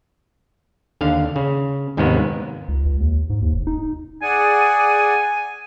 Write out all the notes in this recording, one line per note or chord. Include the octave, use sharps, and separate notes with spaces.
D#2 D3 F5
C#3
D#2 G#2 C3 D#3 G#3 B3
C#2
C#2
D#2
G#2
D#2
F1
D#4
G#4 D5 F#5 G#5 D#7